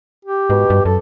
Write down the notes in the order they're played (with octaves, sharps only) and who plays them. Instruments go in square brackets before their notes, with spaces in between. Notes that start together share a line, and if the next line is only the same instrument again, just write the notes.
[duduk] G4
[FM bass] G#2 [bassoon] B2
[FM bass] G2
[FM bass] F#2 [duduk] A4